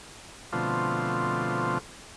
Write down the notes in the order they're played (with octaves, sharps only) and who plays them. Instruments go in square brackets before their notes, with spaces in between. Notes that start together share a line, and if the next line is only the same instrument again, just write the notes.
[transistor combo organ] B2 D3 F3 A3 C4 F4